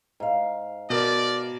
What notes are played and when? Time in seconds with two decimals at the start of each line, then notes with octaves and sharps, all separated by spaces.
0.20 G#2 F5
0.90 B2 A#4 D5